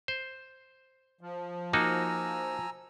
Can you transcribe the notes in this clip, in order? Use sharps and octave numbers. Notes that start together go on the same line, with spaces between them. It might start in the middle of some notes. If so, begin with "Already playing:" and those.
C5
F3
A#3 D#4 F#4 G#5 A#5 E6